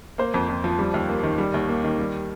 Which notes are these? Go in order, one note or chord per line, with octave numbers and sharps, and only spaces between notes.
A#3 C5
F2
F2
F3
G3
D#2
A#3
D#3
G3
D#2
A#3
D#3
G3